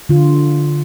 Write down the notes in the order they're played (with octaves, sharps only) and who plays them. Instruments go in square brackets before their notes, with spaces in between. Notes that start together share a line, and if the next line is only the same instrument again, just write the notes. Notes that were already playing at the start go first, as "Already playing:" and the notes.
[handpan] D3 F4